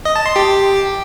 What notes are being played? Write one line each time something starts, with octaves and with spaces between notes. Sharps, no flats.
D#5
A5
C6
G4